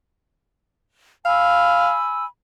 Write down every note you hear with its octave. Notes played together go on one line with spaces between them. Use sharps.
F5 G#5 B5 E6